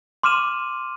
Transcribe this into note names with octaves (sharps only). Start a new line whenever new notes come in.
C6 D6 F6 D#7 E7